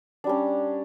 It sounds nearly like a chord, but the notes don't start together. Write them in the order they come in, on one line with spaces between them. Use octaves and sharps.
D4 G3 C#4